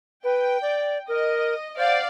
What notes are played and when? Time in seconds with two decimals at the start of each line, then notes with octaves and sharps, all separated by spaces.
0.23 B4 G5
0.61 D5
1.08 A#4 D#5
1.76 C5 D5 F5 F#5